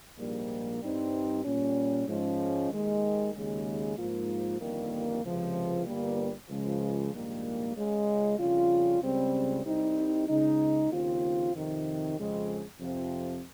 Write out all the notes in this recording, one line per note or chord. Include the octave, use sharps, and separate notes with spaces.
A#1 G#2 G3 A#3
G2 G3 C4 D#4
A#2 G3 C#4
G#2 F3 G#3 C#4
D#2 D#3 G#3
D#2 C#3 G#3
G#2 F3 A#3 F4
G1 F2 D#3 G3 A#3
C#2 C3 F3
G1 G2 G3 A#3
C#2 C#3 F3 G#3
A#1 G#2 D#3 G3 A#3
C#2 C#3 G#3
F2 C#3 G3 C#4 F4
C#2 C#3 G3 C4
C2 C3 G3 C4 D#4
C#2 C#3 G#3 D#4
D#2 C#3 F3 C4 F4
F2 C3 D#3
F2 C#3 G#3 C4
F2 C3 F3 C4